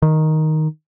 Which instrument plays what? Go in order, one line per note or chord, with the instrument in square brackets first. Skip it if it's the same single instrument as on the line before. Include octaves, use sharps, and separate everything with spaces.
[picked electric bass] D#3